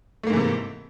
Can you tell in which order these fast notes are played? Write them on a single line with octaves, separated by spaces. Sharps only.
A3 A#3 G#2 E3 C3